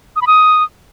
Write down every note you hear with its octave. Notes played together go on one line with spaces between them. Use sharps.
D#6
B5
D#6